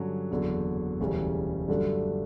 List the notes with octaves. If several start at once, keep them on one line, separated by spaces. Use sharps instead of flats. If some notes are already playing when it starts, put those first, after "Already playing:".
Already playing: G2 D3 F#3 C#4
F#1 E2 D3 F#3
E1 D2 C#3 E3 G3
G2 D3 F#3 A3 D4